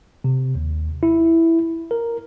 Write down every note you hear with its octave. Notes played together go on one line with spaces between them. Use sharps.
C3
D#2
E4
A#4